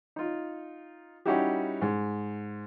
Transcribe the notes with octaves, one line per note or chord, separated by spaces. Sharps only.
D#4 F4
G3 C#4 D#4 E4 F#4 G4
G#2